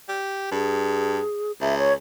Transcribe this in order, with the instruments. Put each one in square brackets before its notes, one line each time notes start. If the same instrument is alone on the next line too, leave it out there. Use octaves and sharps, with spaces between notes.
[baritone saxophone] G4
[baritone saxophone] G2 [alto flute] G#4
[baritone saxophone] C#2 [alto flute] E5
[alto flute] C#5